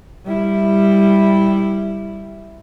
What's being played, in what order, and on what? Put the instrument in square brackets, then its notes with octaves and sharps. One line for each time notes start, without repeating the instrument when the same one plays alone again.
[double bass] G3 E4